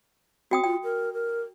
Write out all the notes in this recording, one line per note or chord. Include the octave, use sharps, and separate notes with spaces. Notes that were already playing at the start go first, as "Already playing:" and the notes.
C4 F#4 G5 D#6
F4 G5
A#4
A#4